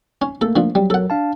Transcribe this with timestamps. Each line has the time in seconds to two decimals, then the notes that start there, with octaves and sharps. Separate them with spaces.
0.22 C#4
0.41 A3 A#3 A4
0.56 D3 F3
0.75 F#3 G3
0.90 F#3 A4 A#4 F#5
1.10 D4 F5 A5